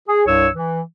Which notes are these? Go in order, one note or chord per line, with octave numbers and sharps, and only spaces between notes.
G#4
C2 G2 C#5 E6
E3